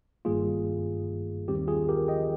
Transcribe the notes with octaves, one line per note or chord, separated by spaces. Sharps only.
G1 G2 D#3 G3 A#3 F4 G#4
D#2 D#3 G3 C4 G4
F4 G#4
G4 A#4
D#5 G5